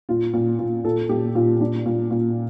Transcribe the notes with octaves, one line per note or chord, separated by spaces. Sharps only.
A#2 F4
A#2
A#2
A#2 A4
A#2 G4
A#2 F4
A#2 D4
A#2
A#2